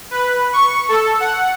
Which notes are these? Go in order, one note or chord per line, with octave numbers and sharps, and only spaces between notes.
B4
C#6
A4
F#5